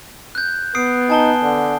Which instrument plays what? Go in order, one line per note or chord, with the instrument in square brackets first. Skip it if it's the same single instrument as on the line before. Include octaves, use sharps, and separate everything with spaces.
[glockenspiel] F#6 G6
[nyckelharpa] B3 [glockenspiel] D#6 C7 D7
[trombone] D#4 [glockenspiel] G#5 A5 G7
[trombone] D3